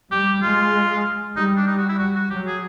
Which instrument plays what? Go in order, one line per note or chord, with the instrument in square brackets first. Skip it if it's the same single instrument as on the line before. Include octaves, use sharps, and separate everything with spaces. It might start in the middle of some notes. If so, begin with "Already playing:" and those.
[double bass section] G3 [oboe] G4
[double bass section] G#3 [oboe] F4
[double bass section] G3 [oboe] D#4
[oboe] D4
D#4
F#4
E4
F#4
F#4
[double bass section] F#3 [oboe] G4
[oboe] G#4